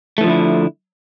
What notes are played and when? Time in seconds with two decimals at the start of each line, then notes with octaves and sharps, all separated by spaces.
0.18 A3
0.21 E3
0.24 F3
0.27 D3
0.29 E4